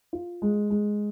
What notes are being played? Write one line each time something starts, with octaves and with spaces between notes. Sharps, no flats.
F4
G#3
G#3